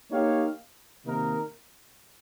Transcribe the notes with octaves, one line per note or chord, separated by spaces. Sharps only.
A#3 D#4 G4 C#5 F5
C3 D#3 A#3 D#4 A#4